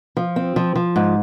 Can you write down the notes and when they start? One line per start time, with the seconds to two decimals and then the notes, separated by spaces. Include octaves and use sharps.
0.17 F3
0.36 C4
0.56 F3
0.76 F3
0.96 G#2